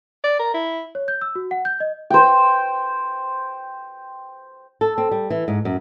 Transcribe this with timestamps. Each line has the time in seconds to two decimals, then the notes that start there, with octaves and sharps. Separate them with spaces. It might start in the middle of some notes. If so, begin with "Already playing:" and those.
0.24 D5
0.40 A#4
0.54 E4
0.95 C#5
1.08 G6
1.22 E6
1.36 F#4
1.51 F#5
1.65 G6
1.80 D#5
2.10 C5 G5
4.81 A4
4.98 C4
5.11 G3
5.30 E3
5.48 G#2
5.65 F#2